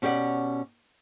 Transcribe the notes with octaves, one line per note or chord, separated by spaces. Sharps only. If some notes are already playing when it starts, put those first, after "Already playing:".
B2 C#4 G4 G#4 D5 F#5